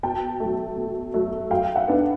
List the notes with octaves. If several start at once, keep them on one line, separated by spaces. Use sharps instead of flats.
B2 G5 A5
F#3 A3
B2
F#3 A3
F#3 F5 G5
E5 F#5
B3 D4